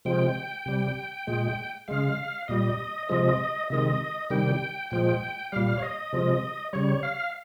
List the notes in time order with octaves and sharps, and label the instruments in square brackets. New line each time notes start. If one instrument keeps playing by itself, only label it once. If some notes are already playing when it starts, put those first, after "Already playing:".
[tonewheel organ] C3 F3 G#3 G5
C3 G3
A#2 G#3
C#3 G#3 F5
A#2 G3 D#5
C3 F3 G#3 D#5
C3 D#3 G#3 D#5
C3 D#3 G3 G5
A#2 F3 G#3 G5
A#2 G3 F5
C#5
D#5
C3 F3 G#3
C#3 G3 C#5
F5